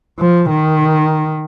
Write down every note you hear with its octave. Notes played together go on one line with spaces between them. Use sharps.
F3
D#3